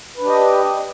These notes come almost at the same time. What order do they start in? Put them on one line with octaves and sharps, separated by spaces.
B4 D4 G4 D#5